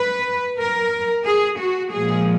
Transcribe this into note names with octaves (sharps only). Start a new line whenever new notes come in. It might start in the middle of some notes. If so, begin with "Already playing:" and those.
Already playing: B4
A#4
G#4
F#4
A#2 F3 G#3 G#4